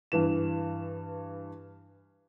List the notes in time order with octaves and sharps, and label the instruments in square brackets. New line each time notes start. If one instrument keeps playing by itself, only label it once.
[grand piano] G2 E3 E7